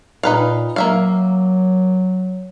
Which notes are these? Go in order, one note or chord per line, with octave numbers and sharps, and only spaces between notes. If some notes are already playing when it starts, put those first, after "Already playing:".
A#2 D#4 B4 F5
F#3 A#3 E5 F5